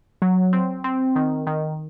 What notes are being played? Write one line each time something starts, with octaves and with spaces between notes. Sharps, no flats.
F#3
C4
C4
D#3
D#3